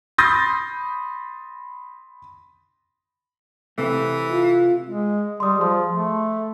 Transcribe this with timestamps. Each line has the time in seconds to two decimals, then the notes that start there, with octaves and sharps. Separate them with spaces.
0.18 B5 C6 D#6 G6 A6 A#6
3.78 C3 E3 A3
4.31 F4
4.86 G#3
5.40 G3 C6 D#6
5.59 F3 G#4 C6
5.91 A3